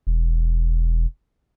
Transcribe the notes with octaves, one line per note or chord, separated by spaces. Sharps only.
E1